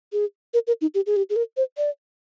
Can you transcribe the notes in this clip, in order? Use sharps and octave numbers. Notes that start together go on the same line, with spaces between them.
G#4
A#4
A#4
D#4
G4
G#4
G4
G#4
A#4
C5
D5